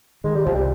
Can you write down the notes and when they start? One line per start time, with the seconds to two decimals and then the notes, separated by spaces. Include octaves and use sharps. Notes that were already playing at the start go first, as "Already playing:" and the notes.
0.24 D#3 G#3
0.35 G3
0.45 C2 F3
0.55 G3